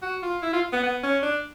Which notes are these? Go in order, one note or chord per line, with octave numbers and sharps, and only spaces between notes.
F#4
F4
E4
F4
B3
B3
C#4
D4